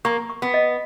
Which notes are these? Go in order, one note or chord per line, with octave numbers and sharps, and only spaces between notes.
A#3 C#6
C#6
B3
D#5